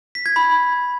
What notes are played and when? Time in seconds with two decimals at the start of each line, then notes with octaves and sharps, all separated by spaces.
0.15 B6
0.26 G#6
0.36 B5